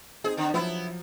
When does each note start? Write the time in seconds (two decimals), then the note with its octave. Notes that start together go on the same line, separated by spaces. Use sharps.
0.24 C4 D#4 G#4
0.37 D3
0.54 F3 F#3 B3 E4